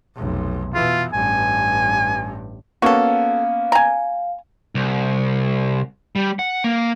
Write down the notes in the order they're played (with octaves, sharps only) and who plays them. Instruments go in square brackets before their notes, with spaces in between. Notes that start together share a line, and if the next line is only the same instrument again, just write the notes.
[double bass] F1 B1
[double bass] B2 E3 [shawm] F4
[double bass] A1 G2 [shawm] G#5
[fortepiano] A#3 B3 C#4 [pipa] F#4 A4 [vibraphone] F5
[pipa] G#5 A#5
[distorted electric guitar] C2
G3
F#5
A#3